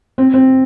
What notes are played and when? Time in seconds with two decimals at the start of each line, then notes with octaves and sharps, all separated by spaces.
0.18 C4
0.34 C4